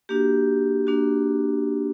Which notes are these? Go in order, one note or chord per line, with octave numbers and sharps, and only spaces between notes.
A#3 D4 F#4 G4
A#3 D4 F#4